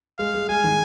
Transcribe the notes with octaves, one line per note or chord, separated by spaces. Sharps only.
G#3 F5
G#3
G#3 G#5
D#3